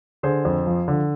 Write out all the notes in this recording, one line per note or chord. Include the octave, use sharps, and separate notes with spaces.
D3 G#4 C5
F2
F3
D3